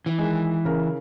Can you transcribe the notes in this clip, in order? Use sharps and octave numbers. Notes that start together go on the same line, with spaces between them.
E3
D#3 G#3
C#3 A#4